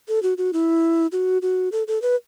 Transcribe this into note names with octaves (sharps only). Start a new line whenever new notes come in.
A4
F#4
F#4
E4
F#4
F#4
A4
A4
B4